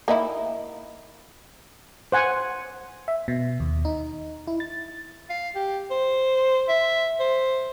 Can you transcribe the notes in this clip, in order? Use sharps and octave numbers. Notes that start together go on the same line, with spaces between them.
A#3 D#4 E4
C5 F#5 G#5
E5
B2
D#2
D#4
E4
A6
F5
G4
C5
E5
C5